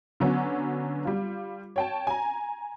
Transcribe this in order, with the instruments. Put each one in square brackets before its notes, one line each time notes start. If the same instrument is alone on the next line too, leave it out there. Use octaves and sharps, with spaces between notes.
[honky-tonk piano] D3 F#3 B3 C#4
G3 F4
C#5 G5 A5
G#5 A#5